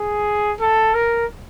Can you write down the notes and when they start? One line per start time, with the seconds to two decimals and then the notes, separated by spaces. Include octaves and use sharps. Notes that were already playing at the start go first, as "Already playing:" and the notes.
Already playing: G#4
0.60 A4
0.94 A#4